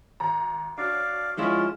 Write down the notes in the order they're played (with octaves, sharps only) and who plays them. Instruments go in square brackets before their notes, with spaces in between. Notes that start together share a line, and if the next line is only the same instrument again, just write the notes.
[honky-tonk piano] G#1 A#5
[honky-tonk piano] D4 F#4 C#5 [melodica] D5 F5
[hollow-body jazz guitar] F3 G#3 E4 [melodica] C#4 F4